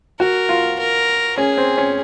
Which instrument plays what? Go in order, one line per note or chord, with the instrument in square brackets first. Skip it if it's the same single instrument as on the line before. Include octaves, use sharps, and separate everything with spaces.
[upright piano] F#4 [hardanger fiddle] A#4
[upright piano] F4
[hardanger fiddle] A#4
[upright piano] C#4 [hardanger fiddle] G#4
[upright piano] C4
C#4